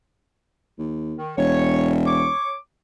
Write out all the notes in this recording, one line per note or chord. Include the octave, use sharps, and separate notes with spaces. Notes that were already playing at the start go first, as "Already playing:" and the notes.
D#2
D#3
E1 C#5
C#5 C#6 D6